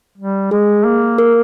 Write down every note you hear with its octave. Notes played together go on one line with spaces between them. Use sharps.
G3
G#3 G#4
A#3
A#4